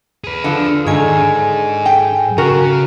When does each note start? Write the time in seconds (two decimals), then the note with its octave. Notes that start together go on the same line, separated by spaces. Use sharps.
0.24 G#4 B4
0.44 D3 F3
0.87 G#2 D3 D#3 G#4 G#5
1.86 G5
2.38 C#3 F#4 A#4